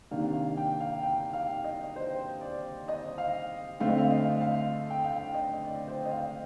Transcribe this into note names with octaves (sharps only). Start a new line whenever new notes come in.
C3 D#3 A#3 D4 F5
F5
G5
F5
G5
F5
D#5
C5
D5
D#5
F5
D3 A3 C4 F5
D#5
F5
D#5
F5
D#5
F5
G5
F5
D#5
D5
C5
D#5
F5